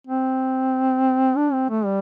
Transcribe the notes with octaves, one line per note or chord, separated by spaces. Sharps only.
C4
D4
C4
A3
G3